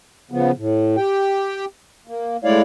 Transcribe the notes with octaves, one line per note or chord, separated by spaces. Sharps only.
C#3 F3 B3
A2
G4 G5
A#3
G#3 A3 E4 C#5 D5 F5